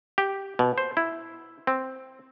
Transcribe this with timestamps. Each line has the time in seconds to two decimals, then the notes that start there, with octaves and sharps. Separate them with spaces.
0.18 G4
0.59 B2
0.78 C5
0.97 E4
1.67 C4